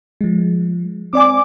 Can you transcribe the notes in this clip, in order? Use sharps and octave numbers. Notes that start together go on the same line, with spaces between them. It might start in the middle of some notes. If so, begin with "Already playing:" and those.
F3 G#3
C4 D5 G#5 D6